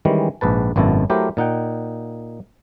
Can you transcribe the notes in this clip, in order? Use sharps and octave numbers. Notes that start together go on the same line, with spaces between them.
D#3 E3 G3 G#3 C#4
A#1 G#2 B4 A5
G#1 F#2 B2 E4 A4
F#3 A3 E4 G4 A#4 C5
A#2 D#4 F#5 G5